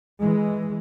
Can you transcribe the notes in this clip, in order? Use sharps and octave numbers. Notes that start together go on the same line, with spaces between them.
E3 G#3